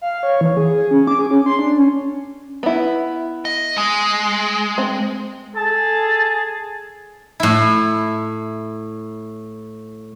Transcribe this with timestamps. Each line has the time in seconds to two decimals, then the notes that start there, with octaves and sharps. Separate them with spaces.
0.01 F5
0.23 C#5
0.41 E3
0.57 G#4
0.74 G#4
0.91 C#4
1.07 D6
1.19 G#4
1.31 C#4
1.46 C6
1.59 D4
1.76 C#4
2.63 B3 E4
3.45 D#5
3.78 G#3
4.78 C4
5.56 G#4 A4 A5
7.40 A2 E4